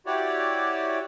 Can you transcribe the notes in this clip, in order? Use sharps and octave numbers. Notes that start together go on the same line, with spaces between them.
E4 F#4 G4 C#5 D5